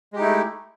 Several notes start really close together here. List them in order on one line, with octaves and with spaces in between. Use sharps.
G#3 G4 D#4 E4 A3